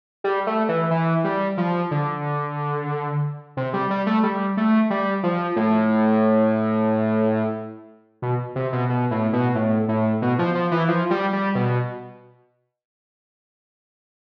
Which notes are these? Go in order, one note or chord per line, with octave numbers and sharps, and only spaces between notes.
G3
A3
E3
E3
G3
F3
D3
C3
G3
G3
A3
G3
A3
G3
F3
A2
B2
C3
B2
B2
A2
B2
A2
A2
B2
F3
F3
E3
F3
G3
G3
B2